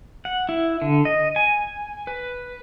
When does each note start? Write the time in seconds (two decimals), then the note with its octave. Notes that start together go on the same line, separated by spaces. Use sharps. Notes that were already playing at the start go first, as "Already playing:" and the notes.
0.25 F#5
0.49 E4
0.82 D3
1.05 D#5
1.36 G#5
2.07 B4